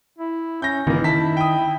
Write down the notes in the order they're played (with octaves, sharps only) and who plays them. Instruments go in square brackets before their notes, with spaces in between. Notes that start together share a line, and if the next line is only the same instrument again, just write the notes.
[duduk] E4
[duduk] C#4 [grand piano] G6 A#6
[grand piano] F#1 E3 [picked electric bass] D#3 [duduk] A#3
[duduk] E4 [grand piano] A5 B6
[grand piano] G5 D#6